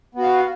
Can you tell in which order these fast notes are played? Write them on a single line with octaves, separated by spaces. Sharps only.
B3 F#4 F5